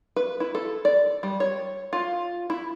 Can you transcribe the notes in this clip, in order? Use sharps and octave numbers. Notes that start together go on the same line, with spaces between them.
B4
E4
A4
D5
G3
C#5
F4
E4